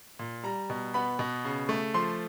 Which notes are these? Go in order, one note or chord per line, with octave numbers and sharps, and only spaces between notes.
A#2
G3 A#5
B2
B3 B5
B2
C#3
A3
F3 C6